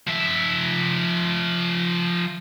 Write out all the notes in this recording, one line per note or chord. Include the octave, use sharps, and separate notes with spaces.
F3 E5